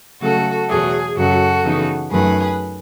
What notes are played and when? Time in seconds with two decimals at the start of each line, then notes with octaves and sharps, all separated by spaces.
0.21 C#3 F#3 A3 F#4 A4
0.68 E2 B2 F#3 A3 G#4
1.16 F#2 C#3 F#3 F#4 A4
1.63 C#3 E3 B3 D#4
2.11 F#2 D#3 F#3 A3 G#4 B4